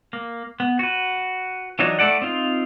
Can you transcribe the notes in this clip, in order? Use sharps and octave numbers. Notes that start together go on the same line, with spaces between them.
A#3
B3
F#4 B4
E3 F#3 D4 D#4 C#5
A3 E4 A4 D5 F#5
C4 D#4 F4